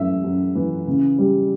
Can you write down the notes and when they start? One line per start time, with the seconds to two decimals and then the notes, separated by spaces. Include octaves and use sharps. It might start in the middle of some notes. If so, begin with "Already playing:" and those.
Already playing: F#2 E3 A3 E5
0.23 F#2
0.55 E3
0.87 C#3
1.18 G3